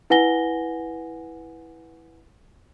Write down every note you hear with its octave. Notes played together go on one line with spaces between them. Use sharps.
E4 B4 F#5 G#5 A#6 G7